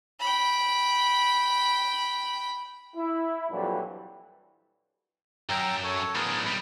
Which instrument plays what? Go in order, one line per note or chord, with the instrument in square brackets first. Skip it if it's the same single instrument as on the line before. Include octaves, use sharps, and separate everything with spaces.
[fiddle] G5 B5
[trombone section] E4
F2 A#2 E3 F#3 G3 D4
[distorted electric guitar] F#2 [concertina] G5 A#5 E6
[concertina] A4 C#5
[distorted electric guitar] A2 D4 [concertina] B3 G#4 A#4
[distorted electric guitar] B1 G3 [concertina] B5